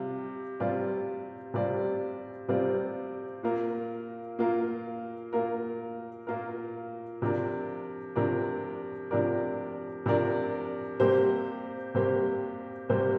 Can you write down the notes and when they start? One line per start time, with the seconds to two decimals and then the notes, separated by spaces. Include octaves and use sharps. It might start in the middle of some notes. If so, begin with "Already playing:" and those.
Already playing: C3 G3 C4 F4
0.60 C3 G3 C4 F4 D5
1.54 C3 G3 C4 F4 D5
2.48 C3 G3 C4 F4 D5
3.43 A#2 A#3 F4 A#4
4.39 A#2 A#3 F4 A#4
5.33 A#2 A#3 F4 A#4
6.27 A#2 A#3 F4 A#4
7.22 C3 F3 D4 A#4 D5
8.16 C3 F3 D4 A#4 D5
9.11 C3 F3 D4 A#4 D5
10.06 C3 F3 D4 A#4 D5
11.00 C3 G3 A#3 G4 C5
11.95 C3 G3 A#3 G4 C5
12.89 C3 G3 A#3 G4 C5